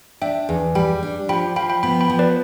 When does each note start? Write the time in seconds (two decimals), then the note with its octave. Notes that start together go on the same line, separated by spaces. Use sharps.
0.22 D4 E5 G5
0.49 E2
0.75 G3 G5 B5
1.03 D4
1.29 F3 G5 B5
1.56 F3 G5 B5
1.70 G5 B5
1.83 B3 G5 B5
2.01 G5 B5
2.10 F3
2.19 B4 D5